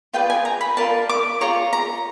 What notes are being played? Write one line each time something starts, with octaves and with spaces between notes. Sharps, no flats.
F4 G#4 B4 D5 G5
G#5
A#5
B5
F4 A#4 D5 A5
D6
F4 G#4 C#5 A#5
A#5